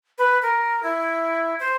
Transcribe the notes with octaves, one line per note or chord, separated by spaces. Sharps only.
B4
A#4
E4
C5